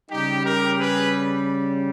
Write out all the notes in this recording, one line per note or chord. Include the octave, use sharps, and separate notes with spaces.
C#3 G3 D#4 G4
G4 A#4
G#4 B4